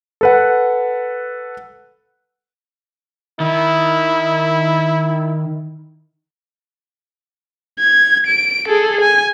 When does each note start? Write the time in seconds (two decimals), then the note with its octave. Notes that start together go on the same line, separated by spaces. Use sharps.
0.21 A4 B4 F#5
3.40 D#3 E4
7.80 G#6
8.27 D7
8.68 G#4 A4
9.01 G#5